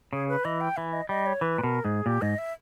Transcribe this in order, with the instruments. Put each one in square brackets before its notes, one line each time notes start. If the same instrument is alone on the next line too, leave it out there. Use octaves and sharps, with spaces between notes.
[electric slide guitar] C#3 [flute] G#4
[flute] B4
[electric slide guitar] E3 [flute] D#5
[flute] G5
[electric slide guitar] E3 [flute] E5
[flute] D#5
[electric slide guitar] G3 [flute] D#5
[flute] C#5
[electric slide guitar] E3 [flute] B4
[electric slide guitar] A#2
[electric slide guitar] B2 [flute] A#4
[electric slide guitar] G#2 [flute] G#4
[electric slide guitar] A#2 [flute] G4
[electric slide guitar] G#2 [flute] D#5
[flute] E5